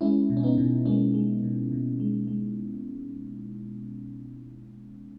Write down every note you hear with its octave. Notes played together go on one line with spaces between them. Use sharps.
G#3 C#4 E4
B2
C#4
B3 D#4
B2
G#3 A#3 C#4
G#3
B2
B2
G#3
G#3